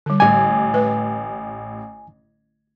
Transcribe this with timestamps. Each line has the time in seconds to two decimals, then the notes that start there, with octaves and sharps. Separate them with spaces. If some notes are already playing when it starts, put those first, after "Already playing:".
0.06 D3 G3
0.20 A1 G#5 D6
0.74 A3 B4